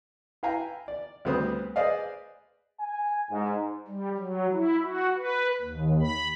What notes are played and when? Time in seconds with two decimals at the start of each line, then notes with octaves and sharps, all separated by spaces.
0.43 E4 B4 F5 G5 G#5 A#5
0.88 D5
1.25 D2 G3 B3 C4 D#6
1.76 G#4 B4 C5 D5 D#5 F5
2.80 G#5
3.30 G#2
3.88 G3
4.18 F#3
4.52 E4
4.83 F#4
5.17 B4
5.61 D#2
6.01 B5